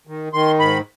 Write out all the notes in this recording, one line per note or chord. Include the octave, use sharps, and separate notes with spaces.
D#3
D#3 C6
G#2 B5